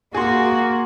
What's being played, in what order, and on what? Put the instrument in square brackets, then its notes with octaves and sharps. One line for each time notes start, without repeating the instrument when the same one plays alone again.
[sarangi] A#3 [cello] F#4 [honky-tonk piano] G#4 C6